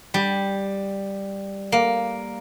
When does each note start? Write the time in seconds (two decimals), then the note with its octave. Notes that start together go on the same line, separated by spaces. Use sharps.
0.14 G3
1.72 A#3